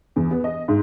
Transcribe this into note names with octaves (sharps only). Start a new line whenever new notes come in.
E2
B3
D#5
G#2